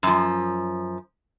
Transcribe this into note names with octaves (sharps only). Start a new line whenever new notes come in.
F#2 F3